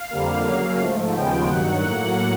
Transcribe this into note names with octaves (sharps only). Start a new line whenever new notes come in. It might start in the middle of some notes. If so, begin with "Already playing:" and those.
Already playing: F5
F2 D3 G3 A#3
C#3 F#3 A#3
G#2 F3 A3
D#2 C#3 F3 G#3 B3 G5
G2 D#3 F#3 F#5
A2 F#3 A#3